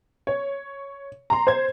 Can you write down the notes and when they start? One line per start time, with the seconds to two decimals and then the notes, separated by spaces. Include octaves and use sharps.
0.27 C#5
1.30 A#5 C6
1.47 C5 G#6